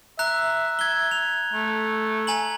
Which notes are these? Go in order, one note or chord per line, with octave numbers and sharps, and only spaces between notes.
E5 A#5 F#6
G#6 G7
F7
A3
G#5 A#5 F#7